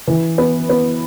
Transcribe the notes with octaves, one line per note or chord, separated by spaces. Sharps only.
E3
B3
B3